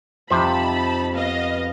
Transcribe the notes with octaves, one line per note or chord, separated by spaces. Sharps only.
F2 C3 D#4 C5 A5 B5
B3 D#5 F5